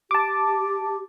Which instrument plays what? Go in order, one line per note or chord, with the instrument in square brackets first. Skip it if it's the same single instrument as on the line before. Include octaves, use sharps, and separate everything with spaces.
[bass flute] G4 [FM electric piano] A5 D6